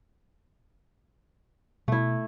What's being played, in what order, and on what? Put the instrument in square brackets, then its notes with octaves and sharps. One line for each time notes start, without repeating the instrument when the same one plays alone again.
[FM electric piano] B2 [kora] A3 E4